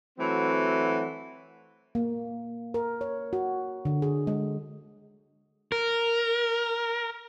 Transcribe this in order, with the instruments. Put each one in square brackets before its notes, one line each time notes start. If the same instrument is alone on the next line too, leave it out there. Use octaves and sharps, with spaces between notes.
[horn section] E3 F#3 A3 C4 F#4
[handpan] A#3
A#4
C#5
F#4
D3
G#4
G#3
[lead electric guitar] A#4